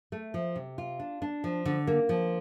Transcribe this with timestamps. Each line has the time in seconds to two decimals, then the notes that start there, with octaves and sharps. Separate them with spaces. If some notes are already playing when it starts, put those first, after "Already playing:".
0.12 A3
0.34 F3
0.56 C3
0.78 F4
1.00 D4
1.22 D4
1.44 F3
1.65 D3
1.87 A#3
2.09 F3